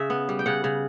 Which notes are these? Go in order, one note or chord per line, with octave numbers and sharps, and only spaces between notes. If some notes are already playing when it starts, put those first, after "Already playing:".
Already playing: C#3 E5
B3
G3
G5
C#3 F#5
C#3